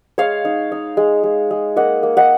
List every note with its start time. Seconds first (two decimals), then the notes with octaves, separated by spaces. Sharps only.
0.18 G#3 C#5 F5
0.45 D#4
0.72 D#4
0.97 G#3
1.23 G#3
1.51 G#3
1.76 A#3 D#5 F#5
2.03 A#3
2.17 D#5 F#5